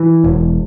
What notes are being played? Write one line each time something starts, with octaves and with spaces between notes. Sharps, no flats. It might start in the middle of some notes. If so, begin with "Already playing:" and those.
Already playing: E3
E1